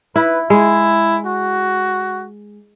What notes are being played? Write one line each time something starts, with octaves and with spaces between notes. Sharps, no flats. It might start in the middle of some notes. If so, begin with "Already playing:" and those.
E4 B4
G#3 E4
F#4